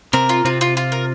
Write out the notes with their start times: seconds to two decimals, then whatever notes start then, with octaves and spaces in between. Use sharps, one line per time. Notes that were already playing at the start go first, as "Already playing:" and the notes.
0.13 C3 C4 A#4
0.29 F4
0.45 C3 C4 F4
0.61 F4
0.77 F4
0.92 A#4